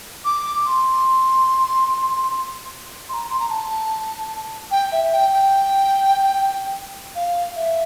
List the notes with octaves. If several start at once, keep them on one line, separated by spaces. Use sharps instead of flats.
D6
C6
C6
A#5
C6
A#5
A5
G5
E5
G5
G5
F5
E5